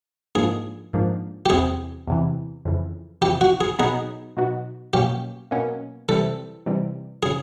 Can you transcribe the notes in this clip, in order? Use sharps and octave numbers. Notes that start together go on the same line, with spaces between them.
G#2 F3 A#3 D4 G#4
G#2 F3 A#3 D4
G4
E2 C3 E3 G#4
E2 C3 E3
F2 C#3 E3
F2 C#3 E3 G4
F#4
G#4
B2 F#3 B3 D#4 F#4 G#4
B2 F#3 B3 D#4 F#4
B2 F#3 A#3 C#4 G4
B2 F#3 A#3 C#4
C3 E3 G3 C4 A4
C3 E3 G3 C4
C#3 G#4